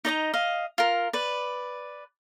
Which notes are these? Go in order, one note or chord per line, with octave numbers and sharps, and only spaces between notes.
D#4 D5 D#5 A#5
D#5 F5
F4 A#4
B4 D5